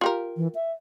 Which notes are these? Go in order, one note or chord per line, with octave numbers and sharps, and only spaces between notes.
F4 G4 A#4
E3
E5